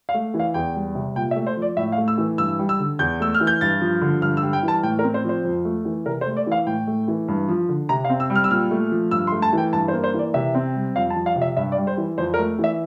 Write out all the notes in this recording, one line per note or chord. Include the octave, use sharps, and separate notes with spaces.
F5
A3
E3
F5
E2 G5
G3
C3
A#2 G5
E5
A3
C5
F3
D5
A2 E5
F5
A3
E6
E3
G2 E6
G3
E6
D3
E2 G6
A3 E6
F6
E3
G6
G2 A6
F3
D3
G2 F6
E6
G3
G5
E3
A5
A2 G5
A#4
C4
C5
F3
C5
F2
A3
E3
C3 A#4
C5
A3
D5
E3
F5
A2 G5
A3
E3
G2
F3
D3
C3 A#5
F5
C4
E6
G3
F6
E6
A#2 F6
A3
F3
G2 E6
C6
A3
A5
E3
G5
G2 A5
C5
A#3
C5
E3
D5
C3 E5
C4
G3
F2 F5
A5
F3
F5
C3
E5
G2 E5
D5
G3
C5
E3
F2 C5
A#4
A3
E3
E5